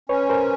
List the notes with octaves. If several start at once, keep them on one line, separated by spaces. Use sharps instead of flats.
C#4 B4 C#5
A#4 C5